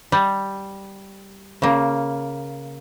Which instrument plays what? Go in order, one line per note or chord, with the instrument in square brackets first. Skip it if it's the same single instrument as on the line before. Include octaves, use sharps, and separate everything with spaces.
[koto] G3
C#3 A#3